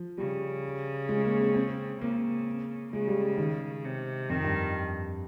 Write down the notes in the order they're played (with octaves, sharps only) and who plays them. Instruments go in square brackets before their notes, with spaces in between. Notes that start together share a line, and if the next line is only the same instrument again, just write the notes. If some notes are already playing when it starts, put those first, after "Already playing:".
Already playing: [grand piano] F3
[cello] C#3 [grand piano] G3
[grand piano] G#3
A#3
C4
C4
[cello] C#3 [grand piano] A#3
[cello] C#3 [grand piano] G#3
[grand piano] G3
D#3
[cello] C3
[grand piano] F2 [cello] D#3
[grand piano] G2